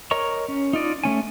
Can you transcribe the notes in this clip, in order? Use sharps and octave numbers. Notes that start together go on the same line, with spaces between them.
A#4 C#5 D#5 A#5 C#6
C#4
D#4 F4 D5 D#5
A3 C#4 G#5